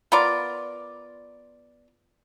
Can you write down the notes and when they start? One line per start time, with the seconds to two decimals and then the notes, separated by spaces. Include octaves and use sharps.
0.12 B3 F4 A#4 D5